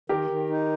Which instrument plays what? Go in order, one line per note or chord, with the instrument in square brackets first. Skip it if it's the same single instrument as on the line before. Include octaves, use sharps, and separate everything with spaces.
[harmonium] D#3 [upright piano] G4 A#4
[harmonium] D#3
D#4